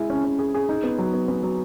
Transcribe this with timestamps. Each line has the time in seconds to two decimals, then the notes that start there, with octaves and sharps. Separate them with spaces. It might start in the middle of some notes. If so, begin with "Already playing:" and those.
Already playing: G#3 E4
0.10 C#4
0.24 C#4
0.39 G#4
0.54 G#4
0.69 D#4
0.83 B3
0.98 F#3
1.13 B3
1.28 B3
1.43 F#3